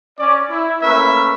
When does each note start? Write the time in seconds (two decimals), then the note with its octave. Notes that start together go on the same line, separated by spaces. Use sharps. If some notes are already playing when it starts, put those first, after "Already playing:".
0.19 C#4 D5
0.50 E4
0.82 A3 A#3 C#4 A#4 B4 E5